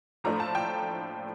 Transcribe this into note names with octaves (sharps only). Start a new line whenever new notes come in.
A2 F3 A3 D4 A#5
A5
G5